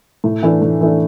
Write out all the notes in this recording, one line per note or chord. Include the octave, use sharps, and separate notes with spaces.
A2
E3 A3 D4
A2
E3 A3 D4